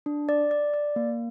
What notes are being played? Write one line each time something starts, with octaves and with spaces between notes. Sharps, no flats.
D4
D5
D5
D5
A#3